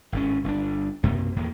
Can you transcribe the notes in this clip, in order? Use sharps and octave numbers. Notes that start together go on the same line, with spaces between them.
G#1 A2 C#4
G1 C4 D4
B1 F#2 C3 A#3
E2 A2 D#3 A#3